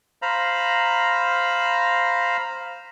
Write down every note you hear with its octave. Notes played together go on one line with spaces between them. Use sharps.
C5 F5 A#5 B5